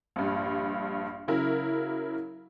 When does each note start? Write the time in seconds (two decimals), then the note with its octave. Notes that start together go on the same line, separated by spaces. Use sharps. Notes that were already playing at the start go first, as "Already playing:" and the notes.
0.16 A#1 G2
1.28 C#3 F#3 E4 A#4